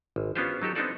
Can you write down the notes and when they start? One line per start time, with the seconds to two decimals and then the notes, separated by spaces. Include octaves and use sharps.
0.16 G#1
0.35 B3 C#4 D4 F4 G4 C5
0.62 F#3 D#4 G4 A4
0.75 B3 C4 D4 D#4 A4 D5